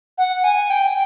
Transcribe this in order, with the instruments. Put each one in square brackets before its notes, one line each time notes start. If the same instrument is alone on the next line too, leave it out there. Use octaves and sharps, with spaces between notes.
[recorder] F#5
G#5
G5